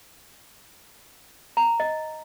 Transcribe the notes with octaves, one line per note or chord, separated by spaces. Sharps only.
A#5
D#5